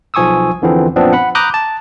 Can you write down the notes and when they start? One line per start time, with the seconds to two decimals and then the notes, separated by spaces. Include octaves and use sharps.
0.14 B1 F3 G#5 C#6 D#6 E6
0.62 E2 D3 E3 F3 B3 C4
0.96 F#2 A#2 F3 B3 C4 D4
1.13 F#5 B5
1.35 A#5 B5 D6 D#6 F#6 G6
1.54 A5